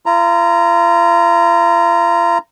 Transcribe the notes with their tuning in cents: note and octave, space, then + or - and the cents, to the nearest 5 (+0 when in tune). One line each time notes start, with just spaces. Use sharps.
F4 -40 A#5 +0